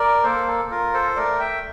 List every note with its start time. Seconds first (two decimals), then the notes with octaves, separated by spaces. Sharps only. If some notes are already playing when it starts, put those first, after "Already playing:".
Already playing: A#4 D5
0.23 A#3 A4 C5
0.47 A4
0.71 F4 A#4
0.94 A4 C5
1.16 A3 A#4 D5
1.40 E5 G5